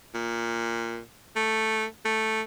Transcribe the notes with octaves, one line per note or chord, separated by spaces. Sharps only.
A#2
A3
A3